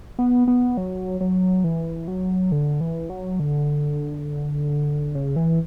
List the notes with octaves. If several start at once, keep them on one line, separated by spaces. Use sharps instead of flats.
B3
B3
F#3
F#3
E3
F#3
D3
E3
F#3
D3
C#3
E3